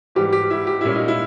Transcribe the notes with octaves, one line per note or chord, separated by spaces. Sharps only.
G#2 E3 G3 G4
G4
E4
G4
A#2 G3 A#3 C#4 E4
D#4
E4